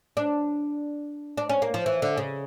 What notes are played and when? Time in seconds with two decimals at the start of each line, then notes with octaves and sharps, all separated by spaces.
0.17 D4
1.37 D4
1.49 C#4
1.62 A#3
1.74 F3
1.86 E3
2.02 D3
2.18 C#3